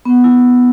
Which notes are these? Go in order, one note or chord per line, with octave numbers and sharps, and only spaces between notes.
B3
E4